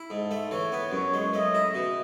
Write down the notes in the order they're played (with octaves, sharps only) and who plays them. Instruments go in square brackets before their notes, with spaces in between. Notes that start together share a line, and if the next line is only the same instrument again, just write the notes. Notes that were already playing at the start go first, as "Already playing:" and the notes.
Already playing: [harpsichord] E4
[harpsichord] G#2 [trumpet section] A4
[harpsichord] A3
[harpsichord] E3 [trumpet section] C#5
[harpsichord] B3
[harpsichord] F#2 [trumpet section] C#5
[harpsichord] G#3
[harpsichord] A3 [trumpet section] D#5
[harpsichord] E4
B2